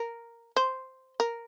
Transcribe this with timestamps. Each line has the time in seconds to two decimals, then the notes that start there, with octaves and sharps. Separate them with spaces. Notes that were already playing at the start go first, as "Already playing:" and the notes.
Already playing: A#4
0.56 C5
1.20 A#4